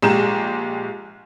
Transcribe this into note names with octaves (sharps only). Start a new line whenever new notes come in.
A#1 G#3 G4 A#5 E7